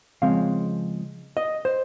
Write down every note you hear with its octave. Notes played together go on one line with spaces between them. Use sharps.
C#3 F3 G#3 C4 F5
D#5
C5